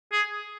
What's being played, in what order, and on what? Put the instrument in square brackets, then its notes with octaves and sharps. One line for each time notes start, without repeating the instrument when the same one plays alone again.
[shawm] G#4